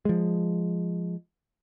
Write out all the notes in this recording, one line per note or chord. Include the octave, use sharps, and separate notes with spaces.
F3 G#3